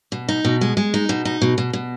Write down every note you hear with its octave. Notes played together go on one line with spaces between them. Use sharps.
B2
D#4
B2
G#3
G#3
D#4
B2
D#4
B2
B2
B2